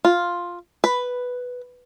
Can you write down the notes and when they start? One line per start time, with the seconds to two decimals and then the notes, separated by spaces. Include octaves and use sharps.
0.05 F4
0.84 B4